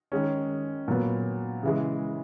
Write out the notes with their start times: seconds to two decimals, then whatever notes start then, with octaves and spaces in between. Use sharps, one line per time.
0.12 D#3 G#3 C#4
0.88 A#2 F#3 B3
1.63 C#3 E3 G#3